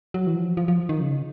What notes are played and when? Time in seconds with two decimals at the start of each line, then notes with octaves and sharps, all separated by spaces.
0.14 F#3
0.27 E3
0.36 F3
0.57 F3
0.68 F3
0.89 D#3
1.00 C#3